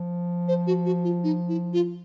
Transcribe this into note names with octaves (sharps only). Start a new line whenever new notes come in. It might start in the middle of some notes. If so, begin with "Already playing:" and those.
Already playing: F3
C5
F#4
F#4
F4
D#4
E4
F4